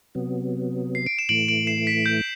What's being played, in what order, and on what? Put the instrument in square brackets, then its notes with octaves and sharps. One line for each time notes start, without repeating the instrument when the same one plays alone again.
[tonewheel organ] C3 F#3 B3
[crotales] C7
D7
E7
[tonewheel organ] A2 E3 A3 [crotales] D7 F#7
[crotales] D7 F#7
C7 E7
B6
G6